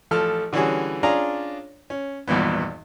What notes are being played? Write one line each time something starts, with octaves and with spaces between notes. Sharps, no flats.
A1 F3 A3 A4 F6
D3 E3 G3 C#4 F#4 G#4
C#4 D4 F4 G#4 D5 A#5
C#4
G#1 E2 G2 A#2 B3